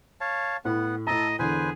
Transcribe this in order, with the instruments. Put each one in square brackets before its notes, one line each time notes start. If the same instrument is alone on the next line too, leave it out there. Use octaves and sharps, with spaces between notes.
[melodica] C#5 F5 A5
[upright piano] A2 [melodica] B3 F#5
[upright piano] A2 A#5 [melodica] A4 A5 [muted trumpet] D#5
[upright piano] E2 D3 [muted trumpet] G#4 [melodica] B4 C5 G#5